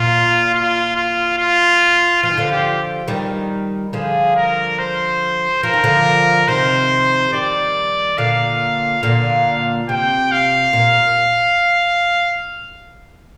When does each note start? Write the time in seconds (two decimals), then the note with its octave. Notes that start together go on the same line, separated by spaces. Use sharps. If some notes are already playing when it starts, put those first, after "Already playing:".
Already playing: A#2 F4
0.54 F4
0.96 F4
1.38 F4
2.23 F3 F4
2.31 D#3
2.37 D3 F3
2.51 G4
3.08 D#3 G3
3.93 D3 F3 G#4
4.36 A#4
4.78 C5
5.63 F3 A#4
5.73 D#3
5.84 D3 F3
6.48 C3 D#3 C5
7.33 D#3 G3 D5
8.18 A#2 D3 F5
9.03 A#2 D3 F5
9.89 C3 G5
10.31 F5
10.73 A#2